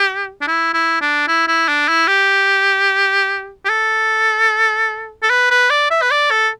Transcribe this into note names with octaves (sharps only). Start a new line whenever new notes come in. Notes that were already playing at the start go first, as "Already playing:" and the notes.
Already playing: G4
D4
E4
E4
D4
E4
E4
D4
E4
G4
G4
A4
A4
B4
B4
D5
E5
B4
D5
A4